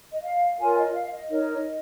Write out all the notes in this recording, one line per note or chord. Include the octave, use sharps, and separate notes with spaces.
D#5
F5
F4 A#4 C#5 G#5
D#5
F5
D#5
D#4 A#4 C#5